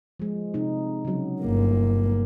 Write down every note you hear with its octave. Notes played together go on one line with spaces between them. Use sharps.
F3 G#3
C3 D#4
C#3 F#3
G1 A#3